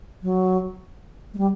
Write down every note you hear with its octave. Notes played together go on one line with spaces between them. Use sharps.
F#3
G#3
G3